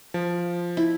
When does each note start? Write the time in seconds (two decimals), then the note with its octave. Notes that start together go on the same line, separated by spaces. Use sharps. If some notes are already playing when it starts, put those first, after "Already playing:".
0.14 F3
0.77 E4